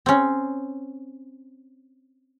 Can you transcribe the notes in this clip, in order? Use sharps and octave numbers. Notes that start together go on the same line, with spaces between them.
C4 C#4